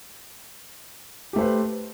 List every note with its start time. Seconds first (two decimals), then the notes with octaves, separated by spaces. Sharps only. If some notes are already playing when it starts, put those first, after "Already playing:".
1.33 G4
1.36 A3
1.38 C5
1.41 B4